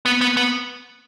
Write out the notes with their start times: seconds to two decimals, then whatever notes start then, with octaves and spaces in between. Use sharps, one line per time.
0.06 B3
0.21 B3
0.37 B3